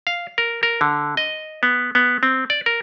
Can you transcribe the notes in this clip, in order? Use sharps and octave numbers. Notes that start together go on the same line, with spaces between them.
F5
A#4
A#4
D3
D#5
B3
B3
C4
D5
A#4